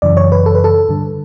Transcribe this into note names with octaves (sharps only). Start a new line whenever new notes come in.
F#2 C#3 E3 D5
C#5
B4
A4
B4
A4
G2 D3